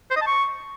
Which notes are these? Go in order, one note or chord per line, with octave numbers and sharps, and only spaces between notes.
C5
D#5
A5
C#6